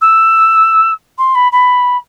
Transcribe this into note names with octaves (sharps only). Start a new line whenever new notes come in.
E6
C6
B5
B5